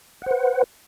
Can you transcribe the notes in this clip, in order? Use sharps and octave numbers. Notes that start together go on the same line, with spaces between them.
B4 C5 F#5